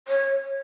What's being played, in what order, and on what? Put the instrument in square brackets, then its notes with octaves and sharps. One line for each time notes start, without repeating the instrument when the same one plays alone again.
[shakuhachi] C#5